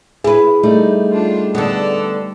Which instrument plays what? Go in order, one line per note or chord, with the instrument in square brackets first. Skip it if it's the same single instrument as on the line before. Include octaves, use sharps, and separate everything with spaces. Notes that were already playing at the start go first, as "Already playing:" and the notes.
[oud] E4 B4 [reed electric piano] G#4
[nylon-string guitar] G3 A3 D#4
[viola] D4 F4
[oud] D3 B3 [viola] A4 D5